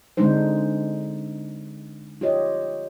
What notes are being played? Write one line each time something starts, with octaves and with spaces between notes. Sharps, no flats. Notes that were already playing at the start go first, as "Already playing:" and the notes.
D3 G#3 C4 D4 D#4 C5
F4 G4 C#5 D#5